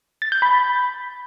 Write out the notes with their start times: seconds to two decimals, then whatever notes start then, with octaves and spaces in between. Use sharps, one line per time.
0.22 A6
0.32 G6
0.42 B5